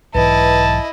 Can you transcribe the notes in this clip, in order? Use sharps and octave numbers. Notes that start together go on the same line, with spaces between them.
B1 G#2 E3 E4 B4 D#5 A5